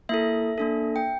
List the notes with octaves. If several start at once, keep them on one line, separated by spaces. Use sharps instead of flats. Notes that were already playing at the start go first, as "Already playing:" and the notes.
A#3 E4 A4 E5
A#3 D4 A4
G5